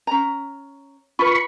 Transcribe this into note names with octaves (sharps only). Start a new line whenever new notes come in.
C#4 A#5
F4 B4 B5 C#6